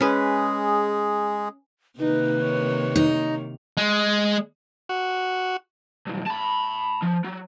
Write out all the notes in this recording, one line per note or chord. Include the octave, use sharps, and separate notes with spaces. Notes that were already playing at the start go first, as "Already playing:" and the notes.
G#3 C#4 G#4 B4
C3 D#3 A#3 D#4 B4
C#5
D#4
G#3
F#4
B1 G2
A5 B5
F3
F#3